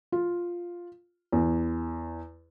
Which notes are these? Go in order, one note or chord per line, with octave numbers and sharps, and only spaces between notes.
F4
E2